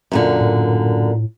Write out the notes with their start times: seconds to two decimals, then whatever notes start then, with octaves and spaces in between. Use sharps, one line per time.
0.12 F#2 A#2 D3
0.41 A2